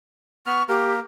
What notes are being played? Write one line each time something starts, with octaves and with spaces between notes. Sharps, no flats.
B3 C#6 F6
A#3 G4 A#4